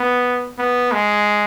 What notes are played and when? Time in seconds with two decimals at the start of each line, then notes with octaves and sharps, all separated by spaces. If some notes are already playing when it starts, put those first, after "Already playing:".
Already playing: B3
0.58 B3
0.92 G#3